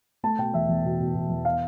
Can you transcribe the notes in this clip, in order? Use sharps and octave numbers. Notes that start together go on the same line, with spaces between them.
A3 A5
B2 G5
E2 E5
E2
B2
B2
B2
E2
F5